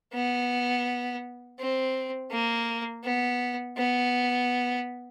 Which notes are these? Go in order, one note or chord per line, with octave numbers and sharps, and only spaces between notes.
B3
C4
A#3
B3
B3